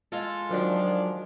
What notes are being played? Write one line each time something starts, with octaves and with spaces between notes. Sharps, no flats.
G#3 F4 A4
D#3 F3 F#3 D4